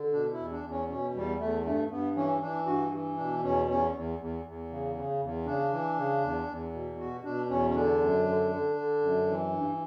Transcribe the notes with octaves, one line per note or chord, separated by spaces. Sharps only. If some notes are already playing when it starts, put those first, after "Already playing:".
Already playing: D3
B2 D4
E4
E2
D4
E2
C#4
B2 C#4
E2 G3
E2 A3
G2 A3
G2 B3
E3 C#4
E3 D4
G2 F#4
E3
B2 D4
E2 C#4
E2 C#4
E2
E2
E2
C#3
C#3
E2
C#3 D4
E3
C#3
E2
E2
B2
B2 F#4
B2 D4
E2 C#4
C#4
D3 D4
F#2
D3
D3
D3
F#2
E3
G2